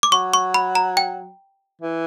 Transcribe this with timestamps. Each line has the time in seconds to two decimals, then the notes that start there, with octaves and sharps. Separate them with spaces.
0.03 D6
0.12 F#3 C#6
0.34 C#6
0.54 B5
0.75 A#5
0.97 G5
1.82 E3